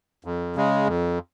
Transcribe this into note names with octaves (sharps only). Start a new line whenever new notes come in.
F2
C#3 G#3
F2